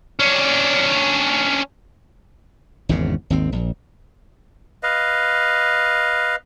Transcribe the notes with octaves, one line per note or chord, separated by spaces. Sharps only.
C#4 D4
G#1 E2 G#2 C#3
G#1 D#2 C4
A#1
B4 D#5 F5